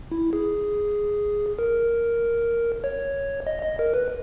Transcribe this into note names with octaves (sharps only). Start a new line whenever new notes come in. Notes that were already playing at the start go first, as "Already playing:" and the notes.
E4
G#4
A#4
C#5
D#5
D#5
A#4
B4